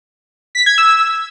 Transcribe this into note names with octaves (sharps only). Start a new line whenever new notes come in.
B6
G#6
E6